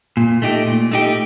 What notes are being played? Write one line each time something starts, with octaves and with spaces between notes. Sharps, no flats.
A#2
A3 D#4 G4
A#2
A3 D#4 G4